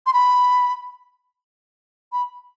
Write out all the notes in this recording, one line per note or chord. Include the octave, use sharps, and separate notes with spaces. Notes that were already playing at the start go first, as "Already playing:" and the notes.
C6
B5
B5